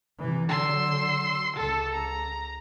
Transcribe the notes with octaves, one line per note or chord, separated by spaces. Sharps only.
C3 E3
D3 F#3 C6 E6
C#2 A4
A#5